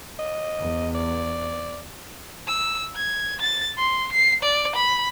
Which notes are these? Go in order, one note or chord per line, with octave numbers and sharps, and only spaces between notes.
D#5
E2
D5
E6
G#6
A6
C6
C7
D5
B5